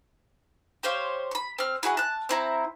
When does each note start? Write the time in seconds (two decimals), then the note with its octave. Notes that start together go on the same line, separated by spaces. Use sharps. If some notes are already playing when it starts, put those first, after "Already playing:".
0.83 G4 C5 C#5 F5
1.31 B5 C#6
1.59 C4 F6
1.83 E4 F#4 G#4 F#5
1.97 A5 F#6
2.29 C4 E4 A#5